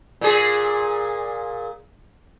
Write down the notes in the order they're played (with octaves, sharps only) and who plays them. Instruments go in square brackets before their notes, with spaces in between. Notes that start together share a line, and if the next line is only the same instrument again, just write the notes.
[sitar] A#2 G#4